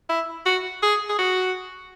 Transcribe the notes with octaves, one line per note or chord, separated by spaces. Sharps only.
E4
F#4
G#4
G#4
F#4